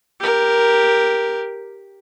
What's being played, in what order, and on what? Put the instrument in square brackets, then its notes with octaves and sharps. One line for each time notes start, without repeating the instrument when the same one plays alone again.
[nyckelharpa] G4 A#4